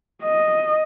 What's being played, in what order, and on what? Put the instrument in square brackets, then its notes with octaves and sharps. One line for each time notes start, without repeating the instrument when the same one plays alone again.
[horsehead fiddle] D#5